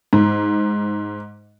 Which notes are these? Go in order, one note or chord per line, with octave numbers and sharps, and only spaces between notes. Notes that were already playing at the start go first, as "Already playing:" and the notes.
G#2